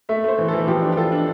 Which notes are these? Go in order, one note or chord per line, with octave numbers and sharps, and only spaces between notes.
A3 E5
A3 C5
E3
A4
E3
F3 G4
D4
G4
F4 A4
D4